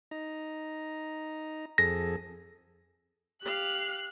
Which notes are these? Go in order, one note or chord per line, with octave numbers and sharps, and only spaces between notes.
D#4 A#5
F2 G#4 A4 A#6
G4 F5 F#6